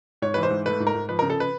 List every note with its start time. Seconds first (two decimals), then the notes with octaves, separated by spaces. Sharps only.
0.22 G#2 C#5
0.34 E3 B4
0.43 C5
0.50 G#2
0.66 A3 B4
0.80 G#2
0.87 A#4
0.94 G#2
1.09 F3 B4
1.19 A#4
1.22 C#3
1.30 A4
1.40 B4